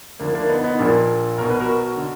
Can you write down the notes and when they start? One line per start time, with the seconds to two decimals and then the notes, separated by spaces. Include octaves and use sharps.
0.20 D2 D3 F3 A#3 D4
0.35 A#3 D4
0.49 B3 D#4
0.64 B3 D#4
0.79 A#1 A#2 F3 A#3 D4
1.38 B1 B2 A#4
1.50 B4
1.60 F#4 A#4
1.97 D3